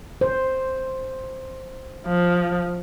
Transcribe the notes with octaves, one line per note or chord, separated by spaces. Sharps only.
C5
F3